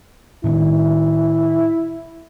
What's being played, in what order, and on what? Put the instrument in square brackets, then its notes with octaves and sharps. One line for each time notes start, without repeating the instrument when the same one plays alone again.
[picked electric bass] A2 D#3 B3 [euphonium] E4